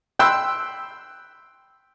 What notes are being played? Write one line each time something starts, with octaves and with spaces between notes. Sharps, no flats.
G5 B5 C6 E6 F#6